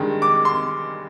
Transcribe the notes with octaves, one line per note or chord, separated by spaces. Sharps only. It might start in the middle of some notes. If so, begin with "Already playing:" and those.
Already playing: G2 D#3 G#3
D6
C6